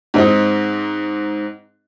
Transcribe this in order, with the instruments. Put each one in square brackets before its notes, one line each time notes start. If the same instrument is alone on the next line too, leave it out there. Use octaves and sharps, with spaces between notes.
[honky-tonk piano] G#2 C4 D#4